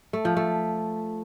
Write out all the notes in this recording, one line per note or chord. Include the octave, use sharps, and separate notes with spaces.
A3
F3
A3